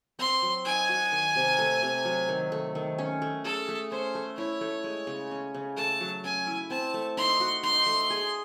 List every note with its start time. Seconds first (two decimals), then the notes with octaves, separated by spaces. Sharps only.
0.19 C4 C6
0.42 F#3
0.65 D#4 G#5
0.89 F#4
1.12 D#3
1.36 C3
1.58 A3
1.83 C3
2.05 F#3
2.29 D#3
2.52 A3
2.75 D#3
2.98 C#4
3.22 A3
3.45 G#4 A4
3.68 A3
3.91 C#4 C5
4.15 A3
4.37 E4 C#5
4.61 A3
4.84 G#3
5.07 C#3
5.31 C#4
5.54 C#3
5.77 A3 A5
6.00 F#3
6.24 C#4 G#5
6.47 E4
6.70 C4 A5
6.94 A3
7.17 D#4 C6
7.40 F#4
7.63 D#4 C6
7.86 A3
8.10 G#4